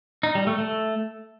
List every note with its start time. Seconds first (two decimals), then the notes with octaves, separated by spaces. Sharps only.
0.23 D#4
0.35 G3
0.47 A3
0.59 A3